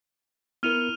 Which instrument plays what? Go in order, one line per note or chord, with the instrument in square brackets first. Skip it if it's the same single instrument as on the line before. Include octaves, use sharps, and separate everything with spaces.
[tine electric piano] B3 E4 A#4 [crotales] F6 D#7 F7